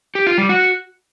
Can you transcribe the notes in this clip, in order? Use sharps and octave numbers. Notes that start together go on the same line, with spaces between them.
G4
F4
G3
F#4